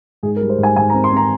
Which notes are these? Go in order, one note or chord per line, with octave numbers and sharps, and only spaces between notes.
G#2 G#4
A#4
G3
C5
G#2
G#5
G#2 G#5
A#5
C4
C6
C4 A#5